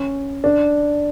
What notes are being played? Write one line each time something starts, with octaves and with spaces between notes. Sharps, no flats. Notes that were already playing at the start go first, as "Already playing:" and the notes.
Already playing: C#4
D4